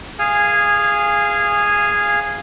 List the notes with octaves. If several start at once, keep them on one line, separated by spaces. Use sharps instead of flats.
G#4 F5 G#5